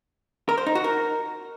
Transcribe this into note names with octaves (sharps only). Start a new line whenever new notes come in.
A#4
C5
D#4
F#4
A#4